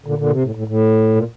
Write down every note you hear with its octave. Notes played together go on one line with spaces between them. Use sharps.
A#2 D3
A#2 D3
C3
A2
A2
A2
A#2